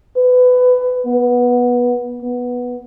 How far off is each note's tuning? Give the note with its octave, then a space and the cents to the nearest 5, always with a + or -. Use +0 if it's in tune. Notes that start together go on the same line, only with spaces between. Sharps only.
B4 +20
B3 -15
B3 -5